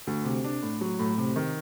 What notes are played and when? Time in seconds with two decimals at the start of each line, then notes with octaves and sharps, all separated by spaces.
0.07 D2
0.25 C3
0.44 D4
0.63 A2
0.81 F#3
1.00 A2
1.18 C3
1.36 D#3